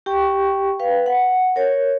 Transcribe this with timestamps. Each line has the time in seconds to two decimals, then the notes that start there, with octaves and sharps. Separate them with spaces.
0.06 G4 G5 C#6
0.80 B4 F5 G5
1.06 F#5
1.56 A#4 C#5